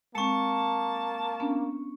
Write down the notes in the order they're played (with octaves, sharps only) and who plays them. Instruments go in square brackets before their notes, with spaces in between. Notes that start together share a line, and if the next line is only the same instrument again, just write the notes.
[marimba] G#3 C4 [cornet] A#3 [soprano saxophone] A5 [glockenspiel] C#6 C#7
[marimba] B3 C#4 D4